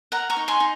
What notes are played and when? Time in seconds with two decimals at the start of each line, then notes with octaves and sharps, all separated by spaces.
0.12 A#4 F#5 A#5
0.30 A#5 C#6
0.37 D#4
0.48 G#5 C6
0.60 D#4